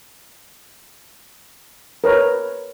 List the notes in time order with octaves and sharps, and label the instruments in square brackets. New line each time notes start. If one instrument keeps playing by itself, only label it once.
[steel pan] A#4 B4 C#5